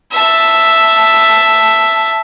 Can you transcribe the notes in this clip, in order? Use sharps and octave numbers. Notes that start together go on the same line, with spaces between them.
E5 A5